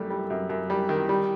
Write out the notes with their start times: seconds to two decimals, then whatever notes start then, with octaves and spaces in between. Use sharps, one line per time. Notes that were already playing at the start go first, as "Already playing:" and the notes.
Already playing: F#2 G3 A3
0.10 G3
0.30 F#2
0.49 F#2
0.70 G3
0.89 D#3
1.09 G3